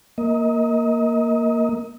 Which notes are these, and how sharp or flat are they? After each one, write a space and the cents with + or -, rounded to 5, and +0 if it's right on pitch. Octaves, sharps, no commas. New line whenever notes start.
A#3 +0 D#5 +30